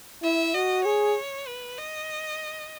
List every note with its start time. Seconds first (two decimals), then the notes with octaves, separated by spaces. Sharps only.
0.23 E4 E5
0.54 F#4 D#5
0.85 G#4 C#5
1.47 B4
1.78 D#5